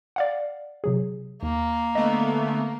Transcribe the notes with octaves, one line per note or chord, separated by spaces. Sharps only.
D5 F5 F#5
C3 F#3 G#4
D#2 A#3
D3 A3 B3 D#5